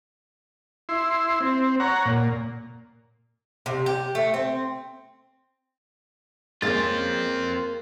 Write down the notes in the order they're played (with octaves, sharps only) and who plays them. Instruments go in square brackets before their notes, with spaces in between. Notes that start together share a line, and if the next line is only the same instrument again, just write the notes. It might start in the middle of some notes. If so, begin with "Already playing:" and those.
[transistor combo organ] E4 C6
C4
C#5 F#5 A#5
A#2
[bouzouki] C3
G4
A3
C4
[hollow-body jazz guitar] G#3 C#4 [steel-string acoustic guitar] A#3 [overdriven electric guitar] C4 F4 [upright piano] A6